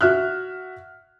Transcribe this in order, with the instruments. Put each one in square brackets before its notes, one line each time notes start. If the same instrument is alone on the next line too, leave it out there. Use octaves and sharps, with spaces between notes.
[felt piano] F#4 E5 F6 F#6